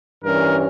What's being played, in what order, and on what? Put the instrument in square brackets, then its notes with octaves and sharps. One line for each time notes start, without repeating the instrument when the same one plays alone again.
[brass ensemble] G2 E3 G3 C#4 A#4